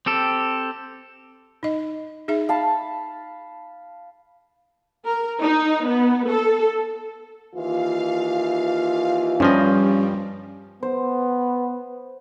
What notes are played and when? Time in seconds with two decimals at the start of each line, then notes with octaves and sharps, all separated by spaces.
0.06 C4 G4 A4
1.63 D#4 D#5
2.28 D#4 G#4 E5
2.49 F5 A5 B5
5.06 A#4
5.40 D#4
5.86 B3
6.27 A4
7.54 D#2 E3 F4 F5
9.40 G2 F3 G3 C#4 D#5
10.83 B3 C5